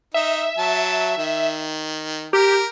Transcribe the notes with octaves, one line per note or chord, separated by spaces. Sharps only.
D#4 E5
F#3 A5
D#3
G4 A#4